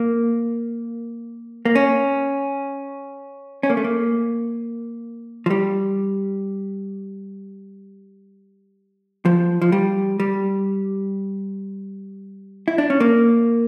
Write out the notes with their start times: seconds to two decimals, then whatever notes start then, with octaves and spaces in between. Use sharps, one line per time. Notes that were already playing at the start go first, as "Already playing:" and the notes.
Already playing: A#3
1.65 A#3
1.75 C#4
3.63 C#4
3.70 A#3
3.77 A3
3.84 A#3
5.46 F3
5.50 G3
9.25 F3
9.62 F3
9.72 G3
10.20 G3
12.68 E4
12.78 D4
12.90 C#4
13.00 A#3